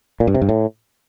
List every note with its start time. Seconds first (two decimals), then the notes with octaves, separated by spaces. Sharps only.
0.20 A#2
0.27 G2
0.34 C3
0.42 G2
0.49 A2